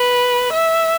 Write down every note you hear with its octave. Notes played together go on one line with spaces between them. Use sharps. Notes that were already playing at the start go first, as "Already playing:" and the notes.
Already playing: B4
E5